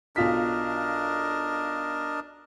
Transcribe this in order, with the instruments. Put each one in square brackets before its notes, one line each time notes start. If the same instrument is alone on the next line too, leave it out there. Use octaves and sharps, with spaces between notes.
[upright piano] B1 F4 B6 [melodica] D4 A#4 D#5